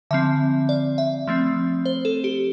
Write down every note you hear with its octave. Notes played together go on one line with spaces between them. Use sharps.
D3 F3 C4 E5
D5
E5
F3 A3 C4
C5
A4
G4